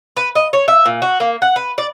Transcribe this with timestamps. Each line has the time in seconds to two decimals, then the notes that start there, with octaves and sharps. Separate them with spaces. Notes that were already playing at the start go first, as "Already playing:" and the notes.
0.17 B4
0.35 D#5
0.53 C#5
0.68 E5
0.86 A#2
1.02 F#4
1.20 A#3
1.42 F#5
1.56 B4
1.78 D5